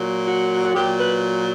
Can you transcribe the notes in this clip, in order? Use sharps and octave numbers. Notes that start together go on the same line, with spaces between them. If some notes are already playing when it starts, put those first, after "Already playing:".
Already playing: A#2 F#3
F#4
F#4
A#2 F#3 G4
B4